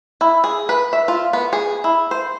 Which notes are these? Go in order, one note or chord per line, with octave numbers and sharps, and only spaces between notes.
E4
G#4
B4
E5
F4
B3
G#4
E4
C5